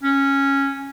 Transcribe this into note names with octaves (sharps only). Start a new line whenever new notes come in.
C#4